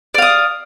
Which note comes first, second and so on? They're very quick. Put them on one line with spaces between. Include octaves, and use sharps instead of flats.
D5 F5 D#6